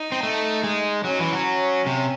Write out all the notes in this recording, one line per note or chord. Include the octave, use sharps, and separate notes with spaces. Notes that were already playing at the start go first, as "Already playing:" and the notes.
Already playing: D#4
C4
A3
G#3
F#3 C#4
E3
F#3
C3